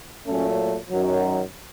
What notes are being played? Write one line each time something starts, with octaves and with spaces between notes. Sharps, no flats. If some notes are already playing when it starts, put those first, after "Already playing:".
A#2 F#3 A3 C#4
F#2 D#3 F#3